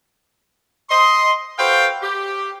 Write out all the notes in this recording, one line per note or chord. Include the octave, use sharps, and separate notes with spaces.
D#5 C6
F#4 A4 B4 C5 F5 G5
G4